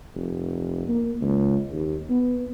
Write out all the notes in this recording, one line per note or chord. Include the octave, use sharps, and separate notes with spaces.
F1
A#3
C#2
D#2
B3